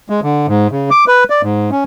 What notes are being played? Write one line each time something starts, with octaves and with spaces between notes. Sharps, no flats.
G#3
D3
G#2
C#3
D6
B4
D5
G#2
C#4